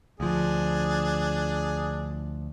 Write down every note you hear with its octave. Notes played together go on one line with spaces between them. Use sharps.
D2 F3 D4 G#4